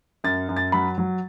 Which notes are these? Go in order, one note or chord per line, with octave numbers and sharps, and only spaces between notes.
F#2 A6
F#2
A6
F#3 B5
F#3